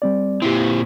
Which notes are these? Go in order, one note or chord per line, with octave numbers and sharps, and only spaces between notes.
G3 C4 D5
A#2 C4 E4 G4